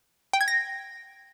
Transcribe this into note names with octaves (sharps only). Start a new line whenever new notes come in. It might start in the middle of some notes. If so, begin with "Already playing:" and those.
G5
G#6
A#6